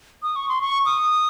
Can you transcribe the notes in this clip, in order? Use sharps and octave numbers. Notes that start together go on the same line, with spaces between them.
D#6
C#6
C6
C#6
D#6